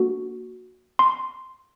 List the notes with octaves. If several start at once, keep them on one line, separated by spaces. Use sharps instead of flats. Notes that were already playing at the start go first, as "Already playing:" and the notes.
Already playing: A#3 D4 F#4 A4
C6